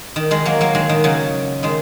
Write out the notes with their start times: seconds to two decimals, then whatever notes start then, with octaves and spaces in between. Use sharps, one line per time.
0.16 D#3
0.31 D#3 G#3
0.45 F#3 A#3
0.61 F#3 A#3
0.75 D#3 G#3
0.89 D#3
1.04 C#3 F#3
1.63 D#3 G#3